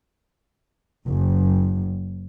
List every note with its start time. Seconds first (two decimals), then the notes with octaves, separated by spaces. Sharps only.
1.07 F#1